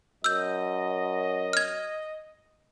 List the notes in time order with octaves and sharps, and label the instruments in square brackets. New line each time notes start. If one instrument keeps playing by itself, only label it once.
[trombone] F#2 [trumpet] D#5 [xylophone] E6 G6
[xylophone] F6 G#6